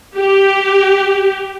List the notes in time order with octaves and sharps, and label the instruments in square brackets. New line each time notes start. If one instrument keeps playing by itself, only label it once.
[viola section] G4